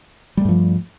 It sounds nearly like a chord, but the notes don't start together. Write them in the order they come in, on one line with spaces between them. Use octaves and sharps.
G3 A3 G2 F3